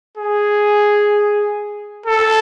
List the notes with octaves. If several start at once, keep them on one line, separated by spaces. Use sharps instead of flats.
G#4
A4